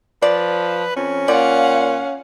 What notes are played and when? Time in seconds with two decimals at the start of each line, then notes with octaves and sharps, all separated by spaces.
0.22 F3 B4 D5
0.96 F2 C#4
1.28 A#2 D5 F5 F#5